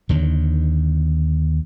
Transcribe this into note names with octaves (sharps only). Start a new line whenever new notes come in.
D#2 D3 D#3